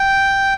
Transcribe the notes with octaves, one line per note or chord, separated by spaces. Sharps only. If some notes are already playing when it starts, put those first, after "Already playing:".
Already playing: G5